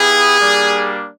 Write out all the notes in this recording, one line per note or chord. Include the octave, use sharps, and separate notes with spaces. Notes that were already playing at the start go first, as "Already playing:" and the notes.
Already playing: B3 E4 G4 G#4
G3 A#3 D4